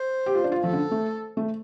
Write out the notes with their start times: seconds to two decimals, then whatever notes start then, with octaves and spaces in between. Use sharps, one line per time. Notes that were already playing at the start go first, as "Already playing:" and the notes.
Already playing: C5
0.26 G4
0.35 F4
0.44 D4
0.52 F4
0.63 F3 A4
0.73 D3
0.91 A3
1.37 A3